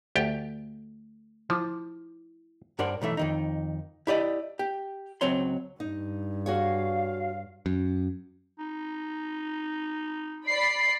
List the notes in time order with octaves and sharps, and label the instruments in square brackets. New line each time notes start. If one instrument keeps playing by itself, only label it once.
[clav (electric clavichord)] D2 G4 G5 [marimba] A3
[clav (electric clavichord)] F3 [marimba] E4 D6
[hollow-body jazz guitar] G2 D4 A#4 C5 D5 F#5
B1 E3 A3 E5
F2 D#3 D#4
E4 G4 D5 D#5
G4
C#2 F#3 C4 C#5 C6
[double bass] G2 [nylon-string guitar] D#4
[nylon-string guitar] F#4 G#4 C#5 [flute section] F5
[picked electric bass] F#2
[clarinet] D#4
[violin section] D5 B5 [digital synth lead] C7